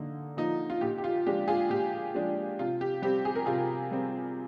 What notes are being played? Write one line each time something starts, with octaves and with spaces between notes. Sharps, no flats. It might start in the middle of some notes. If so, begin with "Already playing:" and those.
Already playing: D3 A#3 D#4
F3 A#3 D#4
F4
A#2 G4
G4
F4
F3 G#3 D4 G4
F4 G#4
A#2 G4
F3 G#3 D4
C3 F4
G4
G3 C4 G4
G#4
A#4
C3 F4 G#4
G3 C4